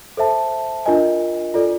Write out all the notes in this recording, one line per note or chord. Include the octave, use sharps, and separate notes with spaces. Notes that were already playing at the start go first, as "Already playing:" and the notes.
A4 C5 E5 A5
D4 F4 A#4 D#5 G#5
F4 A4 D5